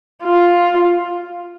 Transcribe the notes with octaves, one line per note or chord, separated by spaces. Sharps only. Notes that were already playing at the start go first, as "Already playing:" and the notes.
F4